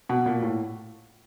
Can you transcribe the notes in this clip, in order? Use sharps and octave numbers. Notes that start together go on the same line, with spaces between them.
B2
A#2
A2